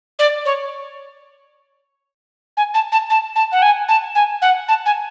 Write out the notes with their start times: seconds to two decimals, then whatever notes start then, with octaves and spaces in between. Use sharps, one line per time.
0.19 D5
0.45 C#5
2.57 G#5
2.74 A5
2.92 A5
3.10 A5
3.35 A5
3.52 F#5
3.62 G#5
3.88 A5
4.15 G#5
4.42 F#5
4.68 A5
4.86 G#5